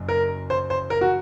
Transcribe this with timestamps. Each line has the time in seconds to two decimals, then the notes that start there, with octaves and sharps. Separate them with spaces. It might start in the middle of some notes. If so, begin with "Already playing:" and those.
Already playing: F#1 F#2
0.09 A#4
0.50 C5
0.70 C5
0.90 A#4
1.01 F#4